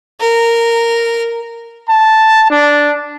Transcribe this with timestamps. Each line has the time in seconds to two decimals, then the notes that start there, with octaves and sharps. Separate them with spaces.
0.20 A#4
1.89 A5
2.50 D4